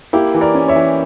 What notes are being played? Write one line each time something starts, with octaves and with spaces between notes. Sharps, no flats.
A#3 E4 G4
E3
A#4 D5
C#4
C#5 E5
E3